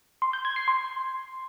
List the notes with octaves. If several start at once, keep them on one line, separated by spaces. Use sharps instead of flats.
C6
G6
G#6
C7
C6